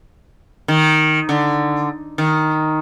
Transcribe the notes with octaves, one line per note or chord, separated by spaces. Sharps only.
D#3
D3
D#3